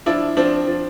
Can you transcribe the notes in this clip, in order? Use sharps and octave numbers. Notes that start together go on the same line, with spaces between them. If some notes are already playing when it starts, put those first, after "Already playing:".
F3 D4 E4
F3 C4 D4
F3